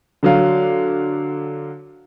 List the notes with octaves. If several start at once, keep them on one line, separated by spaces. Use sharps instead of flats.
D3 F#3 F5